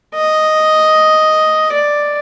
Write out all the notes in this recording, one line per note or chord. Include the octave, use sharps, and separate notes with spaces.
D#5
D5